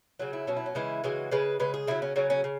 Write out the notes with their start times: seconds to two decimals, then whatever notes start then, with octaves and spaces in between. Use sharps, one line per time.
0.19 C#3 F#3 F#4
0.33 E4
0.47 B2 F#3 C#4
0.57 E4
0.66 C#4
0.75 C#3 E3 G#3 E4
1.04 C#3 E3 G#3 F#4
1.31 C#3 G#3 B4
1.60 C#3 G#3 B4
1.74 G#4
1.87 C#3 F#3 E4
2.02 C#4
2.16 C#3 F#3 C#4
2.30 C#4
2.44 C#3